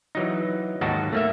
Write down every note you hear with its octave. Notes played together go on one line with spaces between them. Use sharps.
E3 F#3 D#4
D#2 G#2 F#3 D#4 F#4 A5
A3 A#3 E5